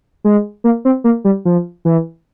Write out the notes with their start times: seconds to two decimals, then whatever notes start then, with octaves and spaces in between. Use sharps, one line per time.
0.24 G#3
0.64 A#3
0.85 C4
1.04 A#3
1.25 G3
1.45 F3
1.85 E3